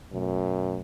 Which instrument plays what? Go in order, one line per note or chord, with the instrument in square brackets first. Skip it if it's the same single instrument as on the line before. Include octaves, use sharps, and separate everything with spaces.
[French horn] F#2 [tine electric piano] B2 F#3 A3